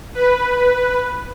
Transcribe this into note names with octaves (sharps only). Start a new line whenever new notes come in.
B4